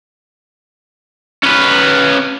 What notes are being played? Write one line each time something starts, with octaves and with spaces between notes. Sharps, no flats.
C#4 B4